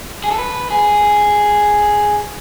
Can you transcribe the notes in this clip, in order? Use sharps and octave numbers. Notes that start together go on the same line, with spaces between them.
G#4
A4
B4
G#4